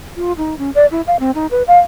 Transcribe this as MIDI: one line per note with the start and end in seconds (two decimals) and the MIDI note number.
0.16 0.33 65
0.37 0.57 63
0.59 0.70 61
0.75 0.86 74
0.91 1.01 64
1.08 1.16 77
1.20 1.31 60
1.35 1.47 63
1.51 1.63 71
1.68 1.79 77